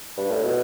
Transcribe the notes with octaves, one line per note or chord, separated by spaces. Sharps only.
G2
A2
B2